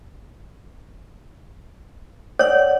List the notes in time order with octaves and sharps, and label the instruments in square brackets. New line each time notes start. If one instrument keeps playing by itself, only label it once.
[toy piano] C#5 [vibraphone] D5 F#5